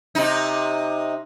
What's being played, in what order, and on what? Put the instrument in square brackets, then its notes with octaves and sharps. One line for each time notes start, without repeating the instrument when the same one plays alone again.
[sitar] C3 D#4